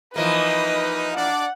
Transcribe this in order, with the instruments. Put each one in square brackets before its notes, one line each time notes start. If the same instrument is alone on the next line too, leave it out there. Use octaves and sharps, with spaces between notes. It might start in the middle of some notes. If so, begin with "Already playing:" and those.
[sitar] E3 F3 A#3 [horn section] D#4 [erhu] B4 [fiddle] D#5
[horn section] D4 D5 [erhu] F#5